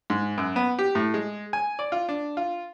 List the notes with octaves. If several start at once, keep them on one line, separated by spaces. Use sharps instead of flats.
G#2
F#2
B3
G4
A2
G#3
G#5
D5
F4
D4
F4